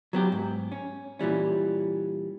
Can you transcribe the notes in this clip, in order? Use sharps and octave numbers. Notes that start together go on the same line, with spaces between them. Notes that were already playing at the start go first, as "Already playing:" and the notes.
F#3 B3 G4
G#2
C#4
A#2 E3 G3 C#4